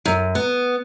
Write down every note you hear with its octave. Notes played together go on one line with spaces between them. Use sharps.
F#2
B3